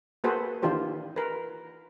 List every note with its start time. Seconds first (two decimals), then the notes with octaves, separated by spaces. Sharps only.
0.24 A#3 F#4 G#4 A4 B4 C5
0.62 D#3 E3 D4 F4 G4 C5
1.16 A#4 B4